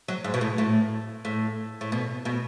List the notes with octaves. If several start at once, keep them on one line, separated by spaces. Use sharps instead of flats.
F#3
G#2
B2
A2
A2
A2
A2
B2
B2